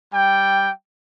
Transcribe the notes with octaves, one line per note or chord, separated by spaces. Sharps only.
G3 G5